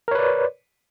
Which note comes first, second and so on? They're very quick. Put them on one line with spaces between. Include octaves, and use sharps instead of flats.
A#4 C#5 B4 D5